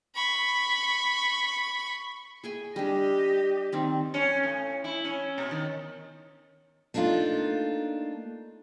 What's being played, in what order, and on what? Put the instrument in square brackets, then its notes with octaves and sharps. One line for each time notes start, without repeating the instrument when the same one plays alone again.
[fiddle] B5 C#6
[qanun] G#4 G5 G#5
[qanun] G3 D4 [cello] G4 D#5
[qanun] D#3 C4 D5
[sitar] C#4
A2
E4
C#4
B2
D#3
[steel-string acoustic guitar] A3 A#3 D4 D#4 F4